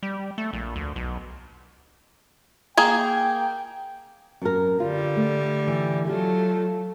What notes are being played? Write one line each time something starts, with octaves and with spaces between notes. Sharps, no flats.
G3
A3
A#1
D2
B1
A#3 G#4 G5
F#2 A#4
D3 G3 F4
A3
E3 G5
F#3 A3 F4 G4